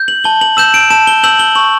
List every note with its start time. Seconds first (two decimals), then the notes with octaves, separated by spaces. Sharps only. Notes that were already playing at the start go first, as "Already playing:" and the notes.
Already playing: G6
0.08 F#7
0.24 A5 G7
0.41 F#7
0.57 E6 G6 E7
0.74 D7
0.90 A5 E7
1.07 G7
1.23 E6 G6 F#7
1.39 G7
1.55 C#6 F#7